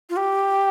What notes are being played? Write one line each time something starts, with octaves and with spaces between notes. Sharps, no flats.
F4
G4